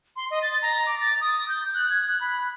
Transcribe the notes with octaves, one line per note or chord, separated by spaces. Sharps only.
C6
D#5
A6
A#5
D6
A6
D#6
G6
F#6
G#6
F#6
B5